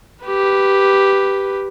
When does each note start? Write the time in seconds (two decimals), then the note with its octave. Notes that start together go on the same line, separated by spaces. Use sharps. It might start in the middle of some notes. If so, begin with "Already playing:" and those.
0.25 G4 B4